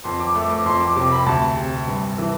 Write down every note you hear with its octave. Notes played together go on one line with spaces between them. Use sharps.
F2 C6
D6
A3 D6
D6
F2 C6
D6
C3 D6
B5
D2 A5
C3
G2
E3